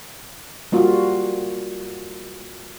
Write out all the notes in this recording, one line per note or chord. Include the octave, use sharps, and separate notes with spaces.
G3 A#3 F4 F#4